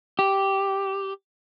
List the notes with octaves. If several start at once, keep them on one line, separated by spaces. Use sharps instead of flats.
G4